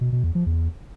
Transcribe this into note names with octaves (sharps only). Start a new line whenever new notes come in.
B2
B2
E2
F3
E2